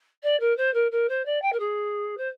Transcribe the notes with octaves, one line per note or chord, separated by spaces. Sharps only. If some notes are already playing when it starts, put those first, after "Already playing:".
D5
A#4
C5
A#4
A#4
C5
D5
G5
A#4
G#4
C5